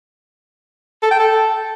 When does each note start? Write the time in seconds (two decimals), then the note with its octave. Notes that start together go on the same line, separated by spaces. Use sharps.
1.03 A4
1.11 G5
1.19 A4